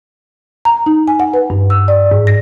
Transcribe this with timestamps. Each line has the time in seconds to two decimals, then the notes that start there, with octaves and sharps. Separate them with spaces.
0.65 A#5
0.86 D#4
1.08 G#5
1.20 F#5
1.34 B4
1.50 G2
1.70 E6
1.88 D5
2.12 G#2
2.27 A#6